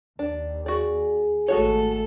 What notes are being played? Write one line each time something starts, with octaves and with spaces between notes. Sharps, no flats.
D#2 D4
F#4 G#4 D5
G#1 G#3 A3 F#4 A4 C#5